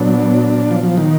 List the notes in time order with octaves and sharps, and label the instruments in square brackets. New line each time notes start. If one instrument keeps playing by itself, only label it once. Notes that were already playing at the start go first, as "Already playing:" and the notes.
Already playing: [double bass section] A#2 F#3 B3 [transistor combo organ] D4
[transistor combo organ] F3
F3
D#3